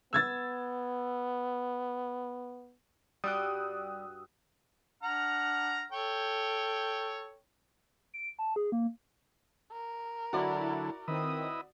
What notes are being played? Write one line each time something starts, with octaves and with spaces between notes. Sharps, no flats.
B3 E6 G#6 A6
G2 G3 F#4 G5 D#6 E6 F#6
D4 F#5 A#5 F6
A4 C#5 G5
D7
A5
G#4
A#3
A#4
D3 F#3 E4 F#4 A4 D5
D#3 C4 E4 B4 D#5 D#6